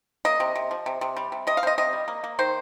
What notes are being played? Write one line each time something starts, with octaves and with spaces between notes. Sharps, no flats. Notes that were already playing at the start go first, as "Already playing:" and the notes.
A#3 D#5
C3
C3
F3
C3
C3
G3
C3
C3 D#5
F5
C3 C5 D#5
C3 D#5
G3
A#3
A#3
D#3 C5